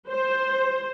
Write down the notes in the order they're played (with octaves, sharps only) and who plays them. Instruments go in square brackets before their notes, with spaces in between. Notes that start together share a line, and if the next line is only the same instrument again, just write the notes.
[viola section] C5